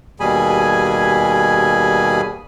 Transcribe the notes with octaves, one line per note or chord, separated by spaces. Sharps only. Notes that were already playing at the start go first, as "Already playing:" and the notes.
D#2 B2 G3 G#4 G#5 B5